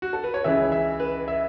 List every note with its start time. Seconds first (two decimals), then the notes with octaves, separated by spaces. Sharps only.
0.02 F#4
0.13 A4
0.24 B4
0.34 C#5
0.44 C#2 C#3 E3 E5
0.72 E5
1.00 B4
1.28 E5